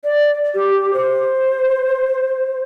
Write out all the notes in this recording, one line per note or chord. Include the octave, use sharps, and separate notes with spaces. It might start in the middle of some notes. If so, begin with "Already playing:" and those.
D5
G4
C5